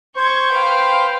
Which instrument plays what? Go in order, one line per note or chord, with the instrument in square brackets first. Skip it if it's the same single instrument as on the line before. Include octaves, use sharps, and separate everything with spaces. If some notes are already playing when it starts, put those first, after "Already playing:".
[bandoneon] C5 [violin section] C#6 G6 G#6
[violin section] B4 F5 G5